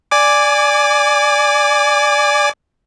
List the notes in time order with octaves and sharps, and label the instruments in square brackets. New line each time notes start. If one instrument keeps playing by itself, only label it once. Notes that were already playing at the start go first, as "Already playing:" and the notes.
[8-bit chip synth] D5 G#5 D6